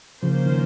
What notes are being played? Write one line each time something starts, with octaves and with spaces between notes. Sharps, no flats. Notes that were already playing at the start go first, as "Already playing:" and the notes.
C#3 F3 A#3 C#4 F4 C5
D#3